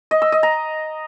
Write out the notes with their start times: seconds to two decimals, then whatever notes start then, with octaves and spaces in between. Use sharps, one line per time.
0.11 D#5
0.22 E6
0.32 D#5
0.43 A#5